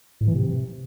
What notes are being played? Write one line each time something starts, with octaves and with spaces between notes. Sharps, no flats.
A2
E3
C3